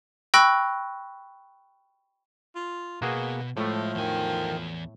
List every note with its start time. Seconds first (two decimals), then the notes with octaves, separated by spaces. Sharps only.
0.34 G5 B5 C#6 E6 F#6 A#6
2.55 F4
3.02 B2 A#3 B3 F#4 G#4
3.57 A2 F3 G#3 A3
3.95 E2 D#3 G#5